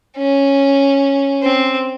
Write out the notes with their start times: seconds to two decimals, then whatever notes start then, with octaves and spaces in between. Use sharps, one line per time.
0.17 C#4
1.43 C4